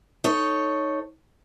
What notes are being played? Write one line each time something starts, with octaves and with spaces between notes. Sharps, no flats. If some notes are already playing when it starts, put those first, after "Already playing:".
D#4 A4 C#5